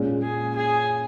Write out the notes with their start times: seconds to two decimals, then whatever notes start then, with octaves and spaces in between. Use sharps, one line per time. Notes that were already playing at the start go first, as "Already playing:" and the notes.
Already playing: A#2 G#3 C#4
0.22 G#4
0.56 G#4